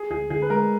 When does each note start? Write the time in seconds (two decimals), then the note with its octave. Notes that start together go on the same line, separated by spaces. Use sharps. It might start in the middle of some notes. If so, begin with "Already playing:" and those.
Already playing: G#4
0.10 D2 G#4
0.30 D3 G#4
0.42 B4
0.50 G#3 A#4